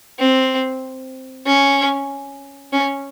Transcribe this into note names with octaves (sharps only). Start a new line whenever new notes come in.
C4
C#4
C#4